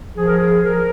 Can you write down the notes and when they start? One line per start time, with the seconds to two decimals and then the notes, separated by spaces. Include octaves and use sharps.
0.16 F3 G#4
0.26 A#4
0.36 G#4
0.63 F3 A#4